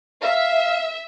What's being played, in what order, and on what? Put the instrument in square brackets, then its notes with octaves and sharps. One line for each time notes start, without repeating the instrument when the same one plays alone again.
[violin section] E5 [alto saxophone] F5